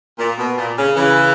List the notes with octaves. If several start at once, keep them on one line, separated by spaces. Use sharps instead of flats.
A#2
B2
A#2
C#3
C#3 E3